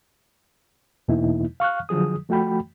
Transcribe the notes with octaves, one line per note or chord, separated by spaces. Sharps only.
E2 B2 E3 A#3 D#4 E4
F5 C#6 F6 F#6
D3 F3 F#3 G#4 D#6
F3 A3 F#4 G5 B5